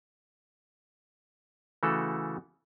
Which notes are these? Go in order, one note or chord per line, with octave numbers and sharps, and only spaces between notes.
C#3 E3 A3 F#4 A4